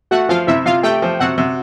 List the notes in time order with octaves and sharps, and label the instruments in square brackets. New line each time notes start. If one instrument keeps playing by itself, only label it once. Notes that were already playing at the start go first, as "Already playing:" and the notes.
[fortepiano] A3 [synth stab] F#4 F#5
[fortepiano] F3 [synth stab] F4 F5
[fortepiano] C3 [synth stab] E4 E5
[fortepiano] C3 [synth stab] F4 F5
[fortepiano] A3 [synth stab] G4 G5
[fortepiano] F3
[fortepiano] C3 [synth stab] F#4 F#5
[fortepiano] C3